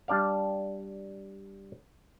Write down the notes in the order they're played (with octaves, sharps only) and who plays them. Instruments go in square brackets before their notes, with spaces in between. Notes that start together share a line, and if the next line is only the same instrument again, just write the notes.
[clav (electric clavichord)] G3 D4 D5 F5